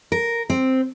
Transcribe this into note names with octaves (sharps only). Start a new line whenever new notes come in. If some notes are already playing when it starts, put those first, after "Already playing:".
A#4
C4